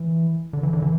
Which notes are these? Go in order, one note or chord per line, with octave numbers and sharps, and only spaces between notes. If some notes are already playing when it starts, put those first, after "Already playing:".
Already playing: E3
D3
E3
D3
E3